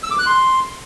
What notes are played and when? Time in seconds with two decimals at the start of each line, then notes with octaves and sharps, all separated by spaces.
0.03 E6
0.11 D6
0.19 F#6
0.26 C6